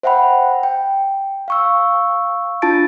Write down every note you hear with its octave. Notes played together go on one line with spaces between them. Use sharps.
C5 E5 F#5 G5 B5
G5
F5 C#6 E6
D4 E4 F4 A5 A6 D7